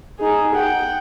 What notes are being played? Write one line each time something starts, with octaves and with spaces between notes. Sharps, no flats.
D#4 G#4
F#5 G5